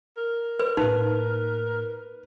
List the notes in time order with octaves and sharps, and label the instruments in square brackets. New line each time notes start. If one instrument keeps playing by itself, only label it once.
[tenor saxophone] A#4
[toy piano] B4
[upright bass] A2 A#3 [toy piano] D#4 [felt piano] B4